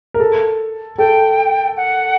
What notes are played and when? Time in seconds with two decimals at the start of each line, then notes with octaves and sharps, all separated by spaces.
0.14 A#4
0.20 A4
0.98 A4 G5
1.77 F#5